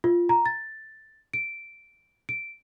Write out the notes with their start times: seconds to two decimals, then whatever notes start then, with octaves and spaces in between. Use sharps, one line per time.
0.04 F4
0.29 A#5
0.46 A6
1.34 D7
2.29 D7